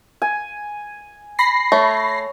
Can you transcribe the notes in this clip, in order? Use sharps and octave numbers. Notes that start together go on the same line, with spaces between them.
G#5
B5 A#6 C7
A3 C#5